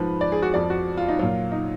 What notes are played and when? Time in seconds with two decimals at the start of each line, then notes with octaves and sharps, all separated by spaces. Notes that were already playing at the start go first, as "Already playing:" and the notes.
Already playing: G#2 F3 B4
0.21 D5
0.32 G#4
0.42 F#4
0.54 F2 F3 D5
0.70 F#4
0.97 F4
1.08 D#4
1.19 A#2 F#3 F4
1.52 D#4